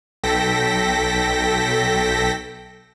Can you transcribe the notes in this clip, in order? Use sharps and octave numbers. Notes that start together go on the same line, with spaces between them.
B1 A4 G5 A#6 B6